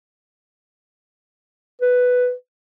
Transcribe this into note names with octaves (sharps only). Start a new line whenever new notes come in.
B4